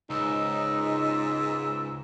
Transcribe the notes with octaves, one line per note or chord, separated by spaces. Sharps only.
C#2 G#2 D#4 E6